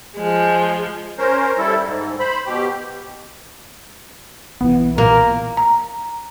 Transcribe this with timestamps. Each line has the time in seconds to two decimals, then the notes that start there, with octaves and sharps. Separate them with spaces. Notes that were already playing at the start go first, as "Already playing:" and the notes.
0.16 F3 G#3
1.18 C#4 A#4 C5
1.58 G3 E4 A4
1.85 G#2
2.20 C5 B5
2.46 B2 G4
4.61 B1 E3 B3
4.98 A#2 A#3 A#4
5.57 A#5